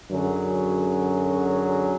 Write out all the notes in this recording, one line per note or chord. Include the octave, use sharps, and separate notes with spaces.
F#2 D3 F#3 C#4 G#4